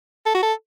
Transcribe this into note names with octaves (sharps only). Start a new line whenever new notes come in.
A4
F#4
A4